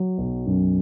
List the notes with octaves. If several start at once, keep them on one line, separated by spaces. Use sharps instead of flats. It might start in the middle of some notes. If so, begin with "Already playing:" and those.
Already playing: F#3
B1
F#2